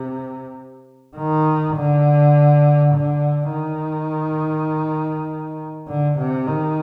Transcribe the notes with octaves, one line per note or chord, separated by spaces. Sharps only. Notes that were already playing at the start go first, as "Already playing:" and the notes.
Already playing: C3
D#3
D3
D3
D#3
D3
C3
D#3